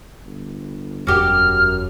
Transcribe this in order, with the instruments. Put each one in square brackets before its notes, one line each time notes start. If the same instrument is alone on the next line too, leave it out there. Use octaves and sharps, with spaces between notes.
[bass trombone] G1
[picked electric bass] E1 [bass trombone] F#2 [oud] F#4 G4 [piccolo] F6